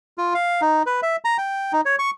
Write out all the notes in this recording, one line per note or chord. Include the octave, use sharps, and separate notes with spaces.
F4
F5
D#4
B4
E5
A#5
G5
D#4
C#5
C#6